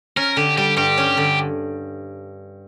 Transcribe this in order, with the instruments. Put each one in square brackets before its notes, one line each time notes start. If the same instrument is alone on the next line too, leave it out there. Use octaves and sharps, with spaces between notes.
[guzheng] C#4 [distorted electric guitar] A#4
[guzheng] D3 [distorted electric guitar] G4
[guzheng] G3 [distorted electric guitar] G4
[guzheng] G2 [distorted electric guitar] G4
[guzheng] C#4
D3